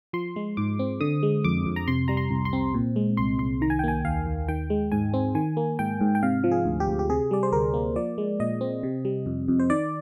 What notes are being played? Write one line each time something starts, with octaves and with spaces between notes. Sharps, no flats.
F3 C6
G#3
G#2 D6
C4
D3 D#6
G#3
F2 D6
F2
A#5
C3 C6
G3 A#5
C6
C2
C6
C4
A#2
G#3
C2 C6
C2 C6
D#3 A#5
G#5
G5
A#3 G#5
D#2 F5
D#2
D#3 G5
G#3
G#2 G#5
C4
D#3 G#5
A#3
G#2 G5
G#2
G5
C3 F5
F3
G#4
D2
G4
D2
G4
C3 G#4
G3 D5
C5
D2 A#4
A#3
F3 D5
G#3
A#2 D#5
C4
C3
G3
F2
F2
C5
D#3 D5